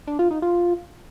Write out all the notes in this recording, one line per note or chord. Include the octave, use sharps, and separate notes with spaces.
D4
F4
D#4
F4